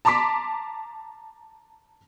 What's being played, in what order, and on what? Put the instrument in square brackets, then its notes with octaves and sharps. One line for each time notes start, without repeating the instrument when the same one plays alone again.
[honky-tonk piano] A5 A#5 C6 D6 B6